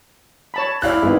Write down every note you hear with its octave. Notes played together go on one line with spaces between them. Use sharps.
C#5 A5 B5
E4 D5 F5 F#6
G#1 B3 G#4